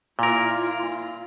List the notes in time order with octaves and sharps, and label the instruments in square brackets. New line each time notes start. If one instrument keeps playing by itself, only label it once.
[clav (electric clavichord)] A#2 A#4 [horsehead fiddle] E4 F4